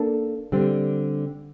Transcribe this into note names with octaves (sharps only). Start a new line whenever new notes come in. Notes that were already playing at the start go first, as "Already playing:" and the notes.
Already playing: A#3 D4 A4
D3 G3 C4